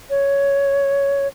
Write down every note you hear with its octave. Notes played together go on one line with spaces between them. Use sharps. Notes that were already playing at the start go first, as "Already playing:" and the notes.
C#5